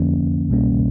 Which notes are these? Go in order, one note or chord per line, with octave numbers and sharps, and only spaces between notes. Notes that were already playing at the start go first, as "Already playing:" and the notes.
Already playing: F2 D3 F3 A#3 C#4
C2 B2 G3 A#3 C#4